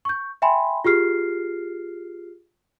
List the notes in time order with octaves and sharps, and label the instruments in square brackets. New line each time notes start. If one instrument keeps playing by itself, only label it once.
[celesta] C#6 G6
E5 G5 G#5 B5 C6
F4 G4 G#4 F6 C7